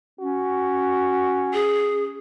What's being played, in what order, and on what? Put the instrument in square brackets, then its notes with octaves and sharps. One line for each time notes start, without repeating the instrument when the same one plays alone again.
[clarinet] C#4 [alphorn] F#4
[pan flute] G#4